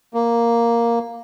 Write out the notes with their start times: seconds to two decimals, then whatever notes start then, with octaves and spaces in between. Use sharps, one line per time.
0.14 A#3